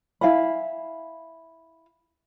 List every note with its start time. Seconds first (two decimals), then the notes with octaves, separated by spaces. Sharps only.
0.21 E4 F5 G#5 B5